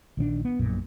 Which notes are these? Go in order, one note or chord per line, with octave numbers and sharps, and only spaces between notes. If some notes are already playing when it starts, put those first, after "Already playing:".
A#1 D#3 C4 D4
B3
A#1 F#2 A#2